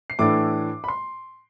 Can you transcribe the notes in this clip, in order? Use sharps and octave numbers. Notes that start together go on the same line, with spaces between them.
C7
A2 E3 A3 D4 D6
B5
C6